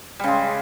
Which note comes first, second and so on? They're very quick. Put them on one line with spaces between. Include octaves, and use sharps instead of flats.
G3 C#3 G#3